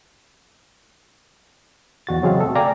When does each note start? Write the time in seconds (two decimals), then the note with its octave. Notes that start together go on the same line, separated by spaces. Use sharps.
2.07 E2 F#4 A6
2.23 C#3 F#3 C4 G#4 D#5 F5
2.40 B2 A3 A4
2.55 D5 F5 G5 G#5 A#5